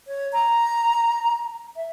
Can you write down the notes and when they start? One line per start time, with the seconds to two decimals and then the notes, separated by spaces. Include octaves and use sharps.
0.07 C#5
0.33 A#5
1.76 E5